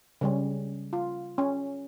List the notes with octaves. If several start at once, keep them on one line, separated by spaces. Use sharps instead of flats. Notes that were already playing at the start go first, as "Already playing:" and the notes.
C#3 G3 C#4
F4
C#4